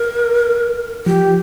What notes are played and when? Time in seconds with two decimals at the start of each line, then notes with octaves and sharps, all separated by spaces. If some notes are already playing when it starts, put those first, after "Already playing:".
Already playing: A#4
1.06 F3 G4